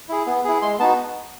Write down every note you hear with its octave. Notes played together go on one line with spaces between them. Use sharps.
E4 G#4
B3
E4 G#4
G#3 C6
B3 D#4 F#4 A5